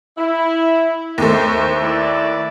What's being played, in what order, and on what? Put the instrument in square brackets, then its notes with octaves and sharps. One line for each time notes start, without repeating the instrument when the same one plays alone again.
[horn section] E4
[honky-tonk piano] D#2 A3 [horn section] C5
[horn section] E4 D5